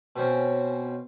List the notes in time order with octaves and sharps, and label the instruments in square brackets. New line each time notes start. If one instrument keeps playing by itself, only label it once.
[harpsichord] B2 C4 C#4